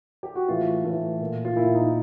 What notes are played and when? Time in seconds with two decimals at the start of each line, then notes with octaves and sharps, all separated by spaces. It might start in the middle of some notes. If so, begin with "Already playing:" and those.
0.23 G4
0.35 F#4
0.48 A2 E3 F4
0.84 A2 E3
1.21 A#2
1.45 F4
1.56 A#2 E4
1.75 D#4